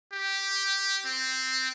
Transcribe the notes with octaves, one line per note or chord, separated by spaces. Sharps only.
G4
C4